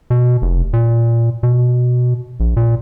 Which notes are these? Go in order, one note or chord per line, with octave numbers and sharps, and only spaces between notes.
B2
F1
A#2
B2
A#1
A#2